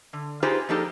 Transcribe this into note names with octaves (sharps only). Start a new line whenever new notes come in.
D3
D#4 F4 G4 G#4 B4 C5
F3 A#3 D4 D#4 G4 A4